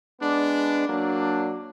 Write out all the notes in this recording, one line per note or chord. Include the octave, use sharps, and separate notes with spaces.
G#3 B3 D4
F#3 A#3 D4